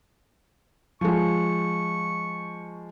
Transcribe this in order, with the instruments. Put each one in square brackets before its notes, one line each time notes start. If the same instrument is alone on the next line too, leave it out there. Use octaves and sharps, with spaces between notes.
[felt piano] F3 G#3 [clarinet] C#6